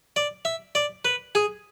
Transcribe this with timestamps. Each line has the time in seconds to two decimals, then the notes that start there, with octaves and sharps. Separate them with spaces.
0.16 D5
0.45 E5
0.75 D5
1.05 B4
1.35 G#4